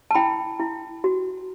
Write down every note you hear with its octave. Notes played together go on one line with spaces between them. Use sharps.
A5
E4 G5 B5
E4
F#4